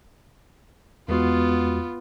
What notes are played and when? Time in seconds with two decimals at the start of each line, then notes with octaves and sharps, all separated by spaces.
1.08 E2 G#3 B3 F4 F#4